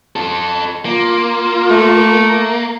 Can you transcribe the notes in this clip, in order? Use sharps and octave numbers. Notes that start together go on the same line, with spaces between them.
F4 A4
A#3 F4
A3